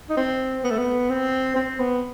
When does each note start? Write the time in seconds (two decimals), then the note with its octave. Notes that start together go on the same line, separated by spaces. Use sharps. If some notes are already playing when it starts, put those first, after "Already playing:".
0.09 D#4
0.17 C4
0.64 B3
0.71 A3
0.78 B3
1.10 C4
1.56 C4
1.80 B3